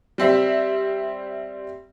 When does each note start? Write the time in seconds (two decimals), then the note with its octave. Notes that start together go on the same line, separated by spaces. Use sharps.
0.18 G3 C4 E5